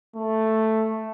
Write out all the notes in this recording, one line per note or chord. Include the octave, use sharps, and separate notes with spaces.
A3